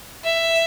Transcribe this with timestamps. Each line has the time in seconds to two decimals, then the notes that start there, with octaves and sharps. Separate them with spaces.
0.24 E5